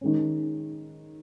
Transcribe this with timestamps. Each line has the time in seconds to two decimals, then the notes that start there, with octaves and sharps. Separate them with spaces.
0.01 D#3 G#3 C#4